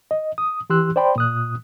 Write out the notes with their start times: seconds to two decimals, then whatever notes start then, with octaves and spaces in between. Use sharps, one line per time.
0.11 D#5
0.38 D#6
0.70 E3 G4 C6 E6 F#6
0.96 C5 D5 G5 B5 C6
1.16 A#2 D#6 F#6